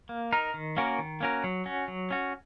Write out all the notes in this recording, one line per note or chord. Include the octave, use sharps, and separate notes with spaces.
A#3
D#4 A#4
D#3
A#3 C#4 F#4 A#4
D#3
A#3 C#4 F#4 A#4
F#3
C#4 F#4
F#3
C#4 F#4